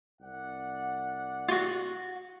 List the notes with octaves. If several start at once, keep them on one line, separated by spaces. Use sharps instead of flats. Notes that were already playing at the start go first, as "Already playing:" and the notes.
C2 D5 F#5
F4 F#4